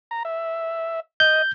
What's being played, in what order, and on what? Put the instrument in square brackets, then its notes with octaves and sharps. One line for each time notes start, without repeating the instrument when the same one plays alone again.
[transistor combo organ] A#5
E5
[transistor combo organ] D#5 [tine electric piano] G6